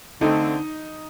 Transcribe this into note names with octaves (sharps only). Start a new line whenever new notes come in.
D3 A3 C4 D#4